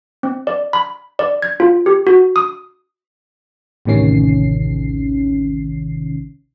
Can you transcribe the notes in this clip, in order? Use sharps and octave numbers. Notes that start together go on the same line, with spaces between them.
C4
D5
B5
D5
G#6
F4
G4
F#4
D#6
A1 D2 C3 D#3 C#4 C7